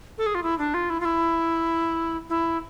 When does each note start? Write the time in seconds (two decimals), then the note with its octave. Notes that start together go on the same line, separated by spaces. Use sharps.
0.18 A4
0.26 G#4
0.35 F4
0.43 E4
0.58 D4
0.74 F4
0.90 E4
1.00 F4
1.05 E4
2.29 E4